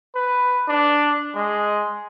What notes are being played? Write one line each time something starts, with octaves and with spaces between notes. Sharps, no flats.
B4
D4
G#3